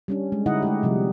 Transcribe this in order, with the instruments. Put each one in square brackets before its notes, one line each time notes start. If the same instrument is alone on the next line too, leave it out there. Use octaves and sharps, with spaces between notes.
[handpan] G3 C#4 D4
G#3
D3 D#4 E4 D#5 F#5
G#3 A3 G4
C3 F3 G3